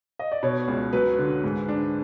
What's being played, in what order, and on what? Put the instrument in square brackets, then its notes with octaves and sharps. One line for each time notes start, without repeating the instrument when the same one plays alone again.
[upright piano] D#5
D5
[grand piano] B2 [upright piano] C#5
[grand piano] C#2
[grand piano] F#3 [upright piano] B4
[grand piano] D3
G#2
D4